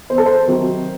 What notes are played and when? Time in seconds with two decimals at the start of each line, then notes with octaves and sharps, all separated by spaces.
0.10 E2 C5
0.18 A4
0.26 C5
0.47 C3 D#3 F#3